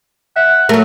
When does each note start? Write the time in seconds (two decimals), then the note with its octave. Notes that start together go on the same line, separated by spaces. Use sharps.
0.36 E5 F#5
0.69 F#3 A3 A#4